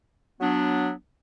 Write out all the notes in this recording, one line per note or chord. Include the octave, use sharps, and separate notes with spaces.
F#3 B3 D4